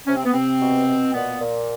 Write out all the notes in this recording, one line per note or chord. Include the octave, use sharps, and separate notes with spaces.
C3 C#4
C4
B3
C3 C4
B2
B2
A#2 B3
A#2